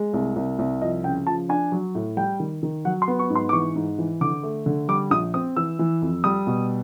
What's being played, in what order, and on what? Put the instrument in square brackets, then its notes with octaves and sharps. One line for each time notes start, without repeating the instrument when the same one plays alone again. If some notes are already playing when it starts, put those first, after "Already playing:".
Already playing: [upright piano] G#3
C2
C2
C2
F3 D#5
C#3 G5
F3 A5
D4 G#5
F#3
A2
G3 G5
D#3
D#3
F#3 F#5
C6
B3
C#6
G#2
C6
D6
E3 C#6
G#2
E3
D3 D6
A3
D3
G3 D6
A#1 D#6
C4 D#6
E3 E6
E3
F2
G3 D#6
B2